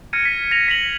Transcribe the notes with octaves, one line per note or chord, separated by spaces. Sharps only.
F6 G#6 A#6 C#7 D#7
B6
A#6 F7
A#6 B6 C#7 F7 F#7